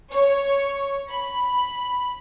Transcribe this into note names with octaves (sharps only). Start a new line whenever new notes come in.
C#5
B5